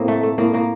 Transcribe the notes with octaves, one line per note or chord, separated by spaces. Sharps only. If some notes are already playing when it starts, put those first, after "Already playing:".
Already playing: A2 A#3 C4
A3
A3
A2 A#3
A2 A#3